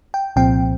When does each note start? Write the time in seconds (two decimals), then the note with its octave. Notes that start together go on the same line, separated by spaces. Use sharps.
0.14 G5
0.36 C2 A#2 F3 C4 G5